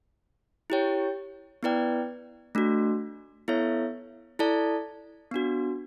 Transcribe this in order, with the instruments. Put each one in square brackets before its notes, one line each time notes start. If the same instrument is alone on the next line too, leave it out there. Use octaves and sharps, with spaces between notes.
[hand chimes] E4 G4 C#5 G5
B3 E4 B4 D5 G5
A3 D4 F#4
B3 E4 A4 C#5 E5
E4 A4 D5 A5
B3 D4 F#4